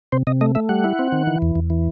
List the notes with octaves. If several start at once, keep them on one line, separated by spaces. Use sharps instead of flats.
C3 C5
C3 D#5
A3 D#5
A3 E5
G3 F#5
E4
C4
D#3
E3
E2
E2
E3